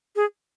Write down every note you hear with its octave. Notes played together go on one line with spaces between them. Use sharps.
G#4